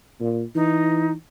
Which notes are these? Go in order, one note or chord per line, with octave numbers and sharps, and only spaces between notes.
A#2
E3 D#4